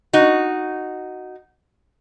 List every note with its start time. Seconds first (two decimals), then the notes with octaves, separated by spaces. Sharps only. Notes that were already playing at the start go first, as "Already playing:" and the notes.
0.13 D#4 F#4